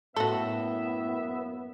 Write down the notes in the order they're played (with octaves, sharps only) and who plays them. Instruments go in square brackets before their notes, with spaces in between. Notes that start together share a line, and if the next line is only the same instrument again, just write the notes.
[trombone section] F#2 A#3 B3 [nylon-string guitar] A2 [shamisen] F#4 A4 [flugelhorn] E5